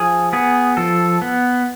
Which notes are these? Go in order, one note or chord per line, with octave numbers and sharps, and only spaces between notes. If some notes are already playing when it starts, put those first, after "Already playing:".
Already playing: F3 G#4
B3 G#4
F3 A4
B3